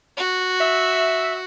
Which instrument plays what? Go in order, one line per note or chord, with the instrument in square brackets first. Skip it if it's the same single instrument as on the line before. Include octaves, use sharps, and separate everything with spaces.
[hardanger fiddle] F#4
[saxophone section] E5